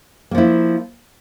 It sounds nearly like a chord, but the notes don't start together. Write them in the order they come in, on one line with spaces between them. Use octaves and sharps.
A#3 F3 E4